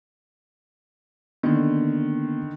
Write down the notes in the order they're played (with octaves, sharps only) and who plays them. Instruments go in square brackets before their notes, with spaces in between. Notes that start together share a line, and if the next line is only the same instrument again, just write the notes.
[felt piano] D3 D#3 [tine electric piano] A#3 B3